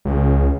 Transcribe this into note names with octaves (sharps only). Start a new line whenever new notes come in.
C#2